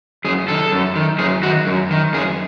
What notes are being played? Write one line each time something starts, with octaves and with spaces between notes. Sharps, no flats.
F#2 G#4
D#3 A4
F#2
D#3
F#2 G#4
D#3 F#4
F#2
D#3
F#2 G#4